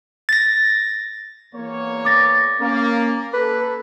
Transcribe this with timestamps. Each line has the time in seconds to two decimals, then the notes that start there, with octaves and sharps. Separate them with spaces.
0.29 A6 A#6
1.55 E2 A#3 C#5
2.05 D6 A6 A#6
2.61 A#3 C#4
3.33 A4 B4